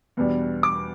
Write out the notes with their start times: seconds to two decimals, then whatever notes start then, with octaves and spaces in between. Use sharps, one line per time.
0.17 E2 B2 G3 D4
0.63 D6